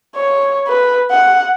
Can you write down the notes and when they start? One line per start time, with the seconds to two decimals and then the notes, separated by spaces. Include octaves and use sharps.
0.16 C#5
0.67 B4
1.11 F#5